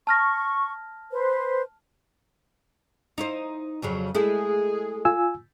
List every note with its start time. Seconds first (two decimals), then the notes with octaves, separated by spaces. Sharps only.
0.07 A5 C#6 F6 A#6
1.11 B4 C5
3.18 D#4 E4 C5
3.82 F2 C#3 F#3
4.15 G#3 A3 E4 G#4
5.05 F4 G#5 E6